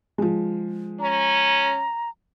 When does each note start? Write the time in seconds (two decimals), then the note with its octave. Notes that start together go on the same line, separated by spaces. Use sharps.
0.18 F3 G#3
1.00 C#4 A#5